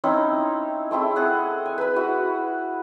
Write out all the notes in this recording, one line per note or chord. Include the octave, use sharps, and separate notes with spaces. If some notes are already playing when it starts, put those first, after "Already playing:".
C4 C#4 D#4 E4
A3 C4 E4 G#4
G#4 A4 F#5
G#5
B4 B5
E4 F#4